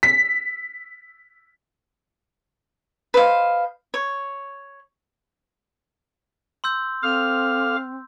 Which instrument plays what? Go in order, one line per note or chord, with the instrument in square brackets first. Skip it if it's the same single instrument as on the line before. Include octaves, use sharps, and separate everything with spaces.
[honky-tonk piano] B6
[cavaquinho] B4 C5 D#5 F5
C#5
[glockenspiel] C6 E6 G6
[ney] C4 [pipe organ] A4 F5 D6 [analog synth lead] F6